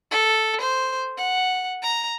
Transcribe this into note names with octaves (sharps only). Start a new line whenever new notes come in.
A4
C5
F#5
A#5